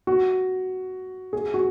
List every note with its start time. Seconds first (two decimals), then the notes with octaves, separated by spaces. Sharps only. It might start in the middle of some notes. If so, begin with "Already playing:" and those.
0.07 F#4
1.33 G#4
1.54 F#4